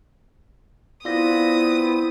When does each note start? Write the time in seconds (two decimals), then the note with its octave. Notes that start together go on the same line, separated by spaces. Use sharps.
1.05 B3 C4 E4 F4 B4 D5 D#6 A#6